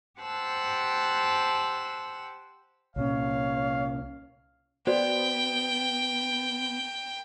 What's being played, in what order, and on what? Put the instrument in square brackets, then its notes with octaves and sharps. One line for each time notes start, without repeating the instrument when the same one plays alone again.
[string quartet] G4 C5 F#5 A5 E6 F#6
[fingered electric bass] C2 A#2 C#4 [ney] C#5 [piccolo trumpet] F5
[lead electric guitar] B3 [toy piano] F#4 C5 D5 [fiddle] G5